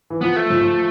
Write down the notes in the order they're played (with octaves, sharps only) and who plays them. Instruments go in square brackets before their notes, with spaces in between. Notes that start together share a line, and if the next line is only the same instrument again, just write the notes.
[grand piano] E3
[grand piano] F3 [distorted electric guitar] B3
[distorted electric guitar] A3
[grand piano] F3
F3